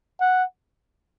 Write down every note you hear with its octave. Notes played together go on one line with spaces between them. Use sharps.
F#5